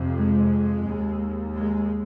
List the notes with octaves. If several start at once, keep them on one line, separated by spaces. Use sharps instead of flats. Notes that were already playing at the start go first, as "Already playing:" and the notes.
Already playing: F2 C3
G#3
D#2
G#3